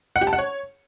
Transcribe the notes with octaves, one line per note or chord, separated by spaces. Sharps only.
F#5
G4
A5
F#5
C#5